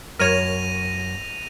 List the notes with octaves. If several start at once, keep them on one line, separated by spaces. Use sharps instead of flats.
F#2 A#4 C#5 A#6 D#7 F7